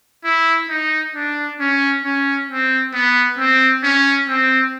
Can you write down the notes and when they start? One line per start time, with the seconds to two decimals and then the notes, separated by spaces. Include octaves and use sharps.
0.24 E4
0.69 D#4
1.15 D4
1.60 C#4
2.04 C#4
2.49 C4
2.93 B3
3.38 C4
3.83 C#4
4.28 C4